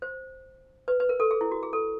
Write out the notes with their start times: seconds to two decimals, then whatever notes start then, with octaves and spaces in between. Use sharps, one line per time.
0.02 C5
0.88 B4
1.00 B4
1.09 A#4
1.20 A4
1.31 G#4
1.41 E4
1.51 F#4
1.63 G#4
1.73 A4